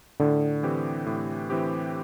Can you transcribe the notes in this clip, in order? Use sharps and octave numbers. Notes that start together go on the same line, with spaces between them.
A2 D3
E3 C4 G4
A2
E3 C4 G4